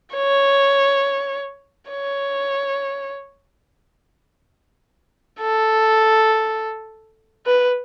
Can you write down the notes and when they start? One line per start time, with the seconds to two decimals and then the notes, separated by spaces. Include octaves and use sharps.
0.15 C#5
1.90 C#5
5.41 A4
7.46 B4